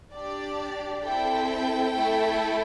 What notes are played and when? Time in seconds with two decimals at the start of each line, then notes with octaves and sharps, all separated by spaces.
0.14 D4 G4 D5
1.03 C4 E4 A4 G5
1.94 A3 E4 A4